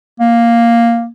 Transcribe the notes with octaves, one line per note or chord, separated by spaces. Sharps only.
A#3